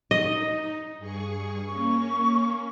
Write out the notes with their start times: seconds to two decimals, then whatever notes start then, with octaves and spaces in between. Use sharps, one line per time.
0.11 D#4 D#5
0.98 G2 G#4 C#6
1.68 A#3 C#4 C#6